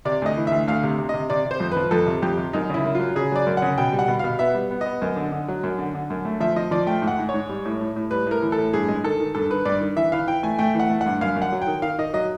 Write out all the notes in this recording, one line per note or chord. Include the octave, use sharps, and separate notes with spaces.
C3 D5
D2 D#5
E3
D2 E5
D2 F5
C3
C3
C3 D#5
C3 D5
C3
C5
F2
F3 B4
F2 A4
C3
F2 G4
C3
F#2 D#4
C#3 E4
F#2
F#3 F4
C#3 G#4
F#3 D5
F#2
C#3 F#5
B2 G5
G3
F#5
B2
B2 F5
B3 E5
G3
B3
B3 D#5
F#2
D3
D3
F#3
F#2
D3
D3
F#2
A3
F3 E5
F3 D#5
F3 D5
A3 G5
G#2
F#5
G#2
C#5
G#2
G3
A2
A2
A2
G3 B4
A2 A#4
E3
A4
A2
G2 G#4
G#3
D#3 A4
D#3
G2 A4
D#3 B4
G2 D5
D#3
E3 E5
E3 F5
E3 G5
A3 G#5
A3 G5
E3 F#5
A3
F#5
G2
F#2 F5
F#2
F#5
F#3
G5
D#3
D#3 F5
D#3 D#5
F#3 D#5